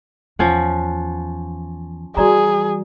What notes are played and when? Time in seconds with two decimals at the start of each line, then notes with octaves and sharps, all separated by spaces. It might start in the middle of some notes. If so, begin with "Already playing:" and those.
0.39 E2 F3 C#4 F#5
2.17 E3 G3 F#4 G#4 D5 A#5